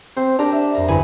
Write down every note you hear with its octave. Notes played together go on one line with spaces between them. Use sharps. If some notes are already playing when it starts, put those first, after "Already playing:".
C4 C5
D4 G4 A#4
E5
F2 A#4
G1 E3 G#5 B5